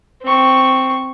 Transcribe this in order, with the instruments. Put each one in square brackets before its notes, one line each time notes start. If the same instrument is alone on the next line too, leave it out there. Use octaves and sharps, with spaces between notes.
[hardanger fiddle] C4 C#6